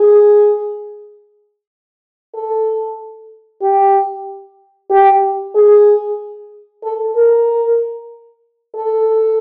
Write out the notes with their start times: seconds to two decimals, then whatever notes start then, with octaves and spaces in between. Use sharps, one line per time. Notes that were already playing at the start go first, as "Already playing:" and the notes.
Already playing: G#4
2.34 A4
3.62 G4
4.90 G4
5.55 G#4
6.84 A4
7.15 A#4
8.75 A4